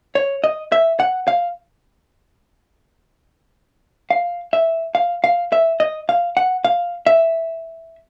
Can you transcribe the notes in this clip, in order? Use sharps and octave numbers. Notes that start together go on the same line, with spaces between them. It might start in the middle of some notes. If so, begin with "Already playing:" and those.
C#5
D#5
E5
F#5
F5
F5
E5
F5
F5
E5
D#5
F5
F#5
F5
E5